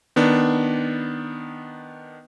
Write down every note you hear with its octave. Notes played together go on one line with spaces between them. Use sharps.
D#3 B3 D4